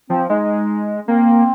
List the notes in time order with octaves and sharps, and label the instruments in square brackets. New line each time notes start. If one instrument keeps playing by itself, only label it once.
[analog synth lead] F3 [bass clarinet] C4
[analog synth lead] G#3 [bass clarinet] D#4
[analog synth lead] A#3 [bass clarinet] C4